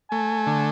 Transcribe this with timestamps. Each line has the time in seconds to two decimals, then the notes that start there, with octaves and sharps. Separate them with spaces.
0.11 A3 G#5
0.47 D3